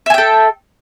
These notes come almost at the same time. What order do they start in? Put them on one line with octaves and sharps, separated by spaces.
E5 G#5 G5 A4